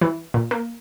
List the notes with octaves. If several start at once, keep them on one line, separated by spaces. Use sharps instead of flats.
E3
A#2
A#3